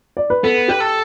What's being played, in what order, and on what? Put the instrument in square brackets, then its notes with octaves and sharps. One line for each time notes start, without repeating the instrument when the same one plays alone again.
[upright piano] D5
B4
[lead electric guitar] B3 [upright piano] A4
[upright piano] G4 [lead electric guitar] B4
[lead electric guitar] A4